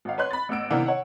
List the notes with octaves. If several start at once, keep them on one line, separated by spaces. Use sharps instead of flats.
G#1 F5
B4 C#5 C6 F#6
B5 A6
A1 B3 E6 D7
C3 D#3 E3 A#3 B3 D4
C#5 F#5